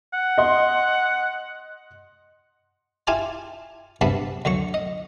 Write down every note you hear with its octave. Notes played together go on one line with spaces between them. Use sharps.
F#5
D#5 C6
E4 F4 G4 G#5 A5
G2 C3 B3 D4 A5 B5
D2 D3 F#3 C#6
D#5